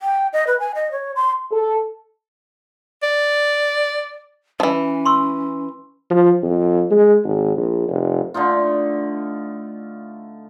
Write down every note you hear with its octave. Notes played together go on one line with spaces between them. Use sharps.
G5
D#5
B4
G#5
D#5
C#5
C6
A4
D5
E3 F3 C#4
C6 C#6 E6
F3
F2
G#3
G#1
A#1
F1
D3 A3 D#4 F4